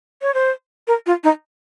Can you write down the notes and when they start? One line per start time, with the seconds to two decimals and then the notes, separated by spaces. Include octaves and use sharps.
0.22 C#5
0.34 C5
0.88 A#4
1.06 F4
1.24 D#4